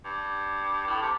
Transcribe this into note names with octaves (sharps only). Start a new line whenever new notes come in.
G2
A2
C3